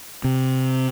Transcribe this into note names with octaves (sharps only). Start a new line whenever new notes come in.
C3